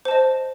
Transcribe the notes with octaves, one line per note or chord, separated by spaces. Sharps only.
C5 D#5 A5